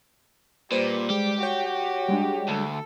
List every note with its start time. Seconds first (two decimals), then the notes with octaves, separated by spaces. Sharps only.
0.72 A#2 G3 B4 C5
1.10 G#3 G4
1.43 F#4 C#5 G5
2.08 G3 G#3 D4
2.48 D2 A4